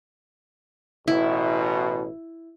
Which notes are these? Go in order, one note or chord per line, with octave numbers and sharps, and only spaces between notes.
A1 B2 E4